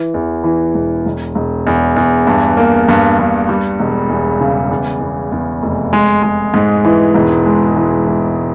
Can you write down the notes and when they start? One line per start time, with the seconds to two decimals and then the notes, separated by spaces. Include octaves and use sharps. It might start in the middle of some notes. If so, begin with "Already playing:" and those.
Already playing: E3
0.14 E2
0.44 E3
0.75 E1
1.06 E1
1.35 E1
1.67 E2
1.96 E2
2.27 G2
2.57 A#3
2.89 G2
3.19 G2
3.49 G3
3.80 E1
4.10 E2
4.40 C#3
4.71 E2
5.01 E2
5.32 E2
5.63 F1
5.93 G#3
6.23 G#3
6.54 G#2
6.85 E3
7.14 E1
7.46 G#3
7.76 E3
8.07 E3